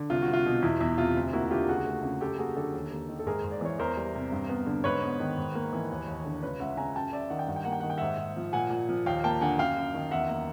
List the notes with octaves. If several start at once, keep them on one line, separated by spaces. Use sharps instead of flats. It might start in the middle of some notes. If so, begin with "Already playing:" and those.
Already playing: D3
C2 F4
F#4
C2
F4
B2
E2 E4
E2 E4
C3 F4
D2
A#3 E4 F#4
D3 F4 G4
C#2 F#4 G#4
A3
C#3
F#2 G4 A4
A#3 F#4 G#4
D3 G4 A4
D#2
A#3
D#3
A4
G#2 G#4 A#4
G#2
D5
E3 C#5
E2 A#4 C5
G3
C3
G2
B3
D3
G#2 B4 C#5
B3
D#3
G#2
A#3
E3
D#2
D#2
D3
C#2 B4 C#5
C#2 E5 F#5
C#3 G#5 A#5
F#2 G5 A5
F#2 D5 E5
D#3 F#5
G5
G2 F#5
G5
A#3 F#5
G5
D#3 F#5
G5
G#2 E5 F#5
G#2
F3
A#2 F#5 G#5
A#2
F3
D#2 F5 G5
A#3 G5 A5
D3 F#5 G#5
F#2 F5 G5
F#2
D#3
E2 E5 F#5
A#3